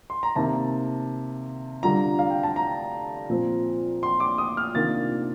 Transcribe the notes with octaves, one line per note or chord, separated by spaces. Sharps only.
C6
A#5
C3 D#3 A#3 A5
D3 G3 D4 F4 A#5
F5
G5
A5
A#5
A#2 F3 C4
C6
D6
D#6
F6
C3 D#3 A#3 D4 F4 A6